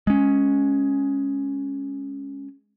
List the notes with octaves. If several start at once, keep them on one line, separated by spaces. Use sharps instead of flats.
G#3 C#4